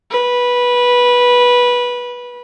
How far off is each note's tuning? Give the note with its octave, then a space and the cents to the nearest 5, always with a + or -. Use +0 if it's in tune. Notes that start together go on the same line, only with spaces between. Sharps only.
B4 -15